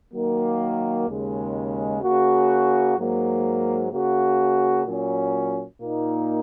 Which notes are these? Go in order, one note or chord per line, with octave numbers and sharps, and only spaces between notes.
D#3 F#3 A#3
D#2 C#3 G#3
C#3 A#3 F#4
G#2 F#3 A#3
C#3 A#3 F#4
A#2 F#3 C#4
A#2 A#3 D#4